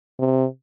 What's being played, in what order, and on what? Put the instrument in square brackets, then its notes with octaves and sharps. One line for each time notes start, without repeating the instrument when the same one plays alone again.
[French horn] C3